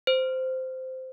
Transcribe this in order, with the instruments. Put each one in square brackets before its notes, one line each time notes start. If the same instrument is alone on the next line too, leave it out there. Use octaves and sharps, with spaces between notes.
[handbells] C5